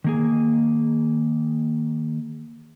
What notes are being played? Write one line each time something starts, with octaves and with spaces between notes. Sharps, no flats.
D#3 A#3 G#4